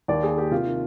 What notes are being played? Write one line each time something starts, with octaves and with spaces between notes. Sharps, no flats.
D#2 D5
A#3 G#4
A#3 G4
C3 F4
D#3